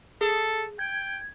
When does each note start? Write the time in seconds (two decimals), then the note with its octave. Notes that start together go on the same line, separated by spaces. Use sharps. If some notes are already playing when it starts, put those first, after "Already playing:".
0.21 G#4 A4
0.79 G5 G#6